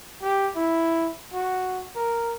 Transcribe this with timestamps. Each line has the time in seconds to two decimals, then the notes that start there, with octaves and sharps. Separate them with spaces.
0.22 G4
0.56 E4
1.33 F#4
1.95 A#4